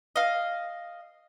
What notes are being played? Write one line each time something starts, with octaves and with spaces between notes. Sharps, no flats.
D#5 F5